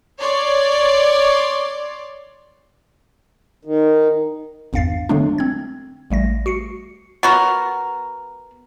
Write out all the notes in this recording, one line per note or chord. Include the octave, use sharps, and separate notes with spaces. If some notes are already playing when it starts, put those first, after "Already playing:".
C#5 D5 C6
D#3
G#1 E2 G2 F5 A6 C7
D3 F#3 G#3 A3 B3 D4
C4 G#6
A1 G3 A3 A#6
F#4 C7 C#7
B3 F#4 A#4